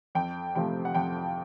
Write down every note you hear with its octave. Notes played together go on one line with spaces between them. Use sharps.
F2 G5
C3 F3 A3 G5
F#5
F2 G5